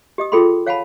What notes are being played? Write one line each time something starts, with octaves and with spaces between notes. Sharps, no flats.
G4 D#5 D#6
F4 G#4 A4 G5 B5 C6
C#5 F5 F#5 G#5 A5 B5